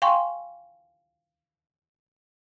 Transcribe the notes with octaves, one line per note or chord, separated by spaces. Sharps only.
F5 G5 G#5 C6 C#6